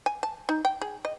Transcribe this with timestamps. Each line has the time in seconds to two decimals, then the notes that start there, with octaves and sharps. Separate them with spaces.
0.06 G#5
0.23 A5
0.49 D#4
0.65 G5
0.81 G#4
1.05 D#5